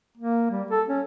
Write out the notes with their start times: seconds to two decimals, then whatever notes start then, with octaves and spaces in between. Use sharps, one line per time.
0.17 A#3
0.51 G3
0.71 A4
0.89 C#4